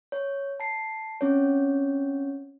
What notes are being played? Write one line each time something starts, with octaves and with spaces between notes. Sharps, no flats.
C#5
A5 C7
C4 C#4 C#5